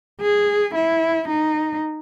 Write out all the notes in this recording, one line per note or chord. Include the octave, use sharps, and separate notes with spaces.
G#4
E4
D#4